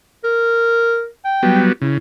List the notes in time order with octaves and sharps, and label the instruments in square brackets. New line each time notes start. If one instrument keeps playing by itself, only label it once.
[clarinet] A#4
G5
[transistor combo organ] F#3 G3 B3
[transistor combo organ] C#3 [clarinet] E4